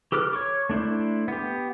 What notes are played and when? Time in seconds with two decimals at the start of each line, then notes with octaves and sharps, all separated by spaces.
0.12 G4 A4 B4 D6 F6
0.33 C#5 C#6 D6
0.69 A3 D4 E4 C5
1.28 B3 G4